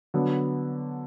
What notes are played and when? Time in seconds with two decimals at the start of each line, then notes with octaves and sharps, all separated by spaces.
0.14 D3 F#3 B3